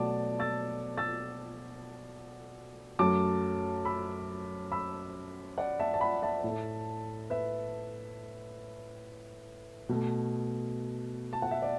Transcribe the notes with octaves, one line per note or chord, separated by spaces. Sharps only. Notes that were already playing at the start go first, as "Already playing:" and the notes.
Already playing: B2 F#3 A3 D5 F#5 A5 D6
E6 A6
E6 A6
F#2 F#3 A3 A5 D6
B5 E6
B5 E6
D5 F#5
E5 A5
A5
F#5 B5
E5 A5
A2
A3
B4 E5
B2 A3
A5
F#5
E5
D5